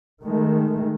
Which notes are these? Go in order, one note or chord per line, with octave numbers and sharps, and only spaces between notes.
D#3 G#3 A3